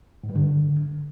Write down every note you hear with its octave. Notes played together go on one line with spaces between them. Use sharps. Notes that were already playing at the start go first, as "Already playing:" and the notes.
G#2
G2
D3